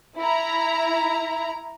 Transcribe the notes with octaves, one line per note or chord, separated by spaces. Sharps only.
E4 A#5